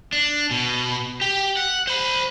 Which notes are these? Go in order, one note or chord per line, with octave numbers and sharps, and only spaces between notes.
D4
B2
G4
F#5
C5 B5